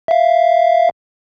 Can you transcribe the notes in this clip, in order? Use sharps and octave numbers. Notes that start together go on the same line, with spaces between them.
E5 F5